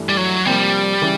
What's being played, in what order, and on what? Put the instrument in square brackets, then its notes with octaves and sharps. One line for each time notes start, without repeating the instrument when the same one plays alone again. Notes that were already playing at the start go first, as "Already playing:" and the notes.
Already playing: [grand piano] G2 E3 A3 D4
[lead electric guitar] G3
F#3
[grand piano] C3 F3 A#3 [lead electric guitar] G3
[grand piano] C#3 E3